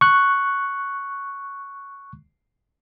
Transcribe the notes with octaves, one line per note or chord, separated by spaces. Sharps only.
C#6 F#6